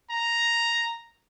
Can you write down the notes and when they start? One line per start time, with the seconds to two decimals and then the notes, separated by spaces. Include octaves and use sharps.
0.10 A#5